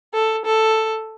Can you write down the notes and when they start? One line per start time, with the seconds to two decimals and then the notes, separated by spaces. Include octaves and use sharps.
0.14 A4
0.45 A4